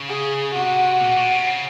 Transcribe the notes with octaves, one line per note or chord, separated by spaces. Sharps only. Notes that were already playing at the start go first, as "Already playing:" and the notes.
Already playing: C#3
G#4
C3 F#4
A#2
A#2
C3
C#3